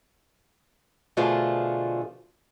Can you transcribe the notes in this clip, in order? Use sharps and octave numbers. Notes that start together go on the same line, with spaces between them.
B2 D3 F3 A3 F4 G#4